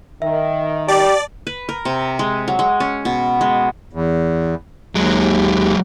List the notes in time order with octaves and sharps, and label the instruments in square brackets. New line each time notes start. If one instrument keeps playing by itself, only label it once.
[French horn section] D#3 [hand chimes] E5
[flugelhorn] G4 [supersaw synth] D5 [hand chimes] A5
[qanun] B4
A#4
C3
G#3
F#3
G#3
C#4
B2
G#3
[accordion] E2
[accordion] D#2 [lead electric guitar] F#3 G#3